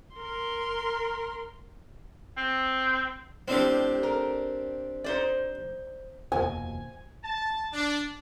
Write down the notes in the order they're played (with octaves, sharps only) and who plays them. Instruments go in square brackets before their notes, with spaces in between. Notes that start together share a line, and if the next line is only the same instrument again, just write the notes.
[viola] A#4 C6
[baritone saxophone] C4
[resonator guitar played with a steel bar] A2 G3 [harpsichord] C4 D4 G4
[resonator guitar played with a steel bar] A#4
D#4 C5 D5
[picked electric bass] F1 D#2 B2 [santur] G#5
[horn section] A5
D4